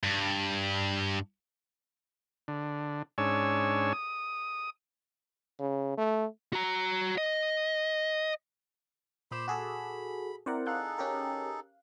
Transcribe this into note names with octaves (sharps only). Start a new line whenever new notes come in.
G2
D3
G#2 C#4 D4 C#5 G#5 E6
D#6
C#3
A3
F#4 A#5
D#5
A#2 C5 B5 C6 D6 E7
F#4 G#4 A4 B5
C4 E4 A#4 C5 D5 F#5
D#4 G#4 A4 F5 F#6
C#4 G4 A#4